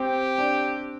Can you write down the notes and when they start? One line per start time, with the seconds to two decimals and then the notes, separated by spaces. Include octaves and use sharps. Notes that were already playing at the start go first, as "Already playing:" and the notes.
Already playing: C4 G4
0.38 D4